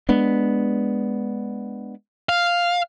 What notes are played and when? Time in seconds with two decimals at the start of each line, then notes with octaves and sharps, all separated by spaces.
0.09 G#3 B3 D4
2.29 F5